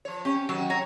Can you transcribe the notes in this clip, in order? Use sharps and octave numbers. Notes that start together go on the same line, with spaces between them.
F3 C#5
C#4 G4
D#3 F#3 F#4
C#5 A#5